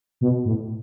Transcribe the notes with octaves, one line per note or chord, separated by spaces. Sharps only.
B2
A2